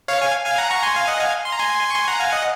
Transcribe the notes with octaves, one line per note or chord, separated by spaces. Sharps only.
C#5 F5
F5 G#5
F5 G#5
F#5 A#5
A#5 C#6
G#5 C6
F5 G#5
D#5 F#5
F5 G#5
C6
A#5
G#5 C6
C#6
G#5 C6
F#5 A#5
F5 G#5
D#5 F#5